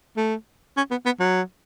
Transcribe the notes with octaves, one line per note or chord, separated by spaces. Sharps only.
A3
C#4
B3
B3
F#3